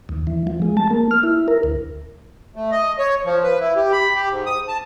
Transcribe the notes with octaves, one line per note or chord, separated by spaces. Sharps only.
D#2
E3
F3
G#3
A5
A#3
F6
E4
A#4
D2
A3
D#5
C#5
F3
B4
E4
G4
B5
G4
G#2
D#6
A5